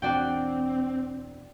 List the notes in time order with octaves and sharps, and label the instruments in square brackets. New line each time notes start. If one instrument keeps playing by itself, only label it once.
[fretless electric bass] E2 B2 D4 [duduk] C4 [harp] F#4 D5 G5